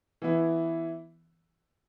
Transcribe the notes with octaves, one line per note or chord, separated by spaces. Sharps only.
E3 B3 E4